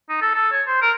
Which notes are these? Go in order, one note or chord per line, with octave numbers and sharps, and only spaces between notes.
D#4
A4
A4
C#5
C5
A#4